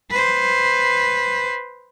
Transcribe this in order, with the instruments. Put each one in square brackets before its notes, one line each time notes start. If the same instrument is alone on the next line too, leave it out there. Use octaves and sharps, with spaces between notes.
[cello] B4 C5